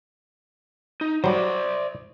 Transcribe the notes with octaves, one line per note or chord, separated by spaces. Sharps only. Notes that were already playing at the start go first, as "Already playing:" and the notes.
D#4
F#3 G3 C5 D5